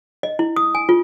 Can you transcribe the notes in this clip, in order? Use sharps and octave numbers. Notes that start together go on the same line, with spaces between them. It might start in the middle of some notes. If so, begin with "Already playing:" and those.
D#5
E4
D#6
G#5
F4